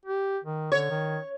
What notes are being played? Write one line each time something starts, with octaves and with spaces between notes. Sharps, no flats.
G4
D#3
D3 C#5
D#3